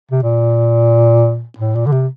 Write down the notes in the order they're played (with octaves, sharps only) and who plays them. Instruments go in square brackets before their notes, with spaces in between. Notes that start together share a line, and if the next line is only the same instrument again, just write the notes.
[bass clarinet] C3
A#2
A2
A#2
D3
C3